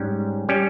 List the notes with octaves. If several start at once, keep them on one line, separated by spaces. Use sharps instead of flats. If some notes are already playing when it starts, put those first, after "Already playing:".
Already playing: G#2 G3 C#4
G3 C#4